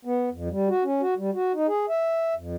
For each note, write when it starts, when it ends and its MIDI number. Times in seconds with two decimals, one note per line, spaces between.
0.05 0.29 59
0.32 0.49 41
0.50 0.69 55
0.69 0.84 66
0.84 1.01 61
1.01 1.14 66
1.18 1.30 55
1.34 1.52 66
1.54 1.67 63
1.67 1.86 68
1.89 2.34 76
2.36 2.56 41